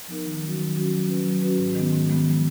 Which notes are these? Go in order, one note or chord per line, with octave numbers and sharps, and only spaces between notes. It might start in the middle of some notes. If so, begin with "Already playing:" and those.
F3 B3 D#4 A#4
D#3
F#3 C#4 F#4
D#3
F#3 C#4 F#4
F#3
C#4 F#4 B4
F#3
C#4 F#4 B4
G#2
D#3 G#3 B3
G#2
D#3 G#3 B3
F3